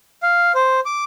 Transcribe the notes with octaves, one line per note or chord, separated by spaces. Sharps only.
F5
C5
D6